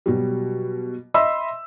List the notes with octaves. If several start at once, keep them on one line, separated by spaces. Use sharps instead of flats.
B2 F#3 G3
D#5 E5 B5 C6 E6